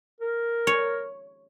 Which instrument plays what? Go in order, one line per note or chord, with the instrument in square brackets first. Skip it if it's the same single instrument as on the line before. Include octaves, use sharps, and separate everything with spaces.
[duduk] A#4
[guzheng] C#5